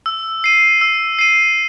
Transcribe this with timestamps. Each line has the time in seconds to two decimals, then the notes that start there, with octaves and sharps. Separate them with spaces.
0.06 E6
0.44 C7 D#7
0.81 E6
1.19 C7 D#7